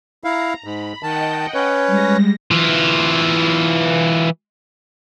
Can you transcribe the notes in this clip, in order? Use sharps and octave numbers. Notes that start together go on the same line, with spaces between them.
E4 F5 A#5
G#2 B5
D#3 D#5 F#5 G5 A5
C#4 B4 C#5
G3 G#3 A#6
E3 F4